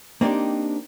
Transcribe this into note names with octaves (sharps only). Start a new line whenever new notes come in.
A#3 C4 D4 D#4 G4